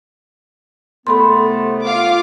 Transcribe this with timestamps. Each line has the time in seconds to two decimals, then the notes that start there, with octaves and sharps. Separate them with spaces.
1.07 C2 A3 B3 A4 B5 C6
1.84 F4 F5 D6